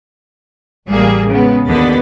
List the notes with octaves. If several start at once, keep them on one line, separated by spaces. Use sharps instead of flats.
A1 G3 A#3 G#4
C#3 G#3 B3
D#2 D3 B3 D#5 A6 B6